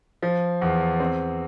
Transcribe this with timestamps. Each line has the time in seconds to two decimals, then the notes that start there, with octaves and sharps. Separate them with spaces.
0.22 F3
0.62 E2
1.00 C4